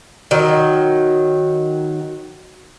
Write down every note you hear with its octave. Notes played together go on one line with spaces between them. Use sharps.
D#3 F#3